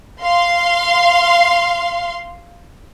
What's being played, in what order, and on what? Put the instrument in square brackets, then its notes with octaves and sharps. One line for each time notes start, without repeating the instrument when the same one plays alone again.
[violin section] F5 C6